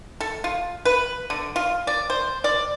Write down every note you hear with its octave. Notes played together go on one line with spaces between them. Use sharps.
A4
F4
B4
D3
F4
D5
C5
D5